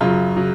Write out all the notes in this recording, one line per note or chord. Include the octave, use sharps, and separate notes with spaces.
F#2 C#3 F#3 F4
C#3 F#3